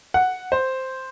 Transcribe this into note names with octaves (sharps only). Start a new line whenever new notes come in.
F#5
C5